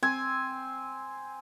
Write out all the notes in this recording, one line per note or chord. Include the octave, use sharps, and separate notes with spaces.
C4 G#5